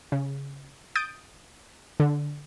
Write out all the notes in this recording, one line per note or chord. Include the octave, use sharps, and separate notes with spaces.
C#3
D#6 G6 A6 D7 D#7
D3